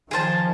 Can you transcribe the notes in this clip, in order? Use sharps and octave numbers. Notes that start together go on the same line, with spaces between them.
D#3 F3 G#4 C5 E5 A5